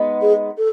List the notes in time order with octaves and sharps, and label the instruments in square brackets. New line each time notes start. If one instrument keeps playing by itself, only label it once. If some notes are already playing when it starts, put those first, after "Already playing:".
Already playing: [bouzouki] G#3 B3 D#4
[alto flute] G#4
A4